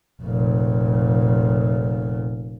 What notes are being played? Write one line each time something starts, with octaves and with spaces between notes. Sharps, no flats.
F1 A#2